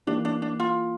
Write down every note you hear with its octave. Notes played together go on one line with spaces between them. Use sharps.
E3 A#3 D4 E4 G4
D4
D4
F4